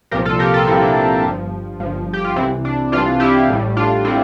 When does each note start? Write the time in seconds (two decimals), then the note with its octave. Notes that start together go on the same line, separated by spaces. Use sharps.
0.11 C2 A#2 F3 G4 A#4
0.25 F4 A4
0.39 G4 A#4
0.53 F4 A4
0.67 C2 A#2 F3 C4 E4
0.82 D4
0.96 D4
1.24 G1 G2 F3
1.80 G1 G2 F3
2.13 G4
2.24 F4
2.36 C2 C3 E3 C4 E4
2.65 D4
2.92 C2 C3 E3 D4 F4
3.20 E4 G4
3.48 A1 A2 G3
3.77 D4 F4
4.05 A2 G3 C4 E4